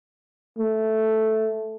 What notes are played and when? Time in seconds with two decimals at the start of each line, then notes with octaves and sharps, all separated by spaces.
0.59 A3